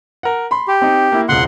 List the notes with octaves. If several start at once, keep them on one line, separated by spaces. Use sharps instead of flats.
A#4 F#5
B5 C6
G4
C4 D#4
A#3 E4
E1 C#2 F#5 C6